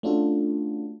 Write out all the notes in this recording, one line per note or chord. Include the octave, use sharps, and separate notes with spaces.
A3 C#4 D4 F4 F#4 A4